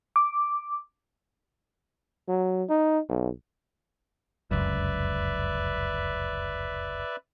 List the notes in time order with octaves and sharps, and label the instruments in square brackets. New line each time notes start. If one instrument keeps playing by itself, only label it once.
[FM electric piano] D6
[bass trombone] F#3
D#4
B1
[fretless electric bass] F1 C#2 F#2 [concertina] B4 D5 E5